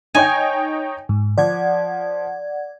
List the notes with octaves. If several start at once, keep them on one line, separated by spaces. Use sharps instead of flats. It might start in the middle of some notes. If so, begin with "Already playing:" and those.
D#4 C#5 G5 G#5
G#2
F3 D5 F#5 G#6